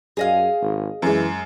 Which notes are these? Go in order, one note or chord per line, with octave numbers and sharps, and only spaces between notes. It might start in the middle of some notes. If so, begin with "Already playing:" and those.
F#2 G#4 D#5 F5
G#1
F#2 E3 G#3